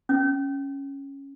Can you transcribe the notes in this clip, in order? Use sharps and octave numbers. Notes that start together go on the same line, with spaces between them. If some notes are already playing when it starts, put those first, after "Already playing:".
C#4